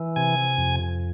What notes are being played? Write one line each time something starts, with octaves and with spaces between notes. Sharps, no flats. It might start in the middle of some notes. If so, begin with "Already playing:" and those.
Already playing: E3
C3 G#5
F2